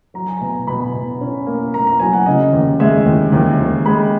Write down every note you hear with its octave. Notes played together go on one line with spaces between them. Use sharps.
F#3 A#5
G#5
B2 A#5
B2 B5
B2
C#4
A#3
A#3 A#5
A#5
F#3 G#5
F#5
C#3 D#5
D#2
G#3 E5
D#2
D#2
D#2
G#3 B5